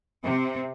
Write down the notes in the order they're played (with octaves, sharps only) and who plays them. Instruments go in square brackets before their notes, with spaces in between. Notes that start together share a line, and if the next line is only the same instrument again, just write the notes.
[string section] C3